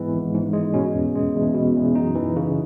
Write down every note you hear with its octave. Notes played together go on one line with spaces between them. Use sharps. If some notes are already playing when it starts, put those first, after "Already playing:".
Already playing: G#2 E3 G#3 B3
G#1
G#2
G#3
B2 C#4
E2
G#3
E2
B2
E2
F#2 D#4
E3
C#3